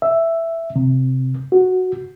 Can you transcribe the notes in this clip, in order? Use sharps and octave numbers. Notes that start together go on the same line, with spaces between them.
E5
C3
F#4